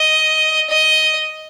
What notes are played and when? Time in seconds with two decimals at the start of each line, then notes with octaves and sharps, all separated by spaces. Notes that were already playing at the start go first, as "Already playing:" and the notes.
Already playing: D#5
0.70 D#5